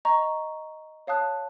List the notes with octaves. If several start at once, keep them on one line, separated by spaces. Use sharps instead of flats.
D#5 A#5 C#6
C#5 F5 A5 D#6 F#6